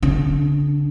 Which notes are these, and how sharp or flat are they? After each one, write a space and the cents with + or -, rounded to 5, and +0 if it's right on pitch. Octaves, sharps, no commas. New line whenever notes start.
D3 -35 D4 +0